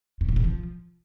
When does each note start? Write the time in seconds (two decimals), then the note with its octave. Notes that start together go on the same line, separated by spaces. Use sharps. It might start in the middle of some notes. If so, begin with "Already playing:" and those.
0.21 G2
0.29 A#2
0.36 A2
0.44 F3